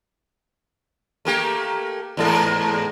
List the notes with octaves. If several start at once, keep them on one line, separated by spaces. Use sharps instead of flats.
A3 A#3 G4
E2 G#2 A4